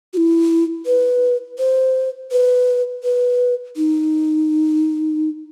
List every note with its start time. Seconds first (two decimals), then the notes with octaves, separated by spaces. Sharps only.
0.13 F#4
0.17 E4
0.86 B4
1.58 C5
2.31 B4
3.03 B4
3.77 D#4